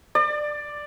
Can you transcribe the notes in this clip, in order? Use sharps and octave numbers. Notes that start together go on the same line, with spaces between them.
D5